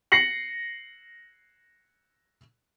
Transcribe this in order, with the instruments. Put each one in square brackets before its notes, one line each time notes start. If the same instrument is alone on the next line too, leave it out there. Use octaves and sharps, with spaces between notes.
[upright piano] A#6 C7 C#7 F#7